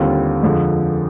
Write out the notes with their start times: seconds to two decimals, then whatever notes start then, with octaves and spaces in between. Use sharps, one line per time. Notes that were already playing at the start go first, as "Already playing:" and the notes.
Already playing: D#2 D3 G3 C4 F4
0.43 F2 D3 F3 G#3